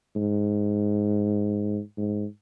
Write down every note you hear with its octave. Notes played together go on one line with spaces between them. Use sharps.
G#2
G#2